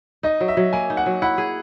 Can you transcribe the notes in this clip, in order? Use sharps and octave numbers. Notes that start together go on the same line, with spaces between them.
D#4 D#5
F#3
E5
F#3
A#3 G#5
D#4
F#5
F#3
E4 F#5
G#4